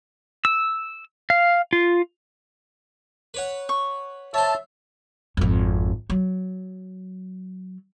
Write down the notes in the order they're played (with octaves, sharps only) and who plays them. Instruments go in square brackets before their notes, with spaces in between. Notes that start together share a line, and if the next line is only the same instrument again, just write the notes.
[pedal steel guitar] E6
F5
F4
[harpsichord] B4 C#5 F#5
[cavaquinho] C#6
[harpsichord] C5 C#5 [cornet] E5 [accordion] A5
[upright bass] G#1 F2
F#3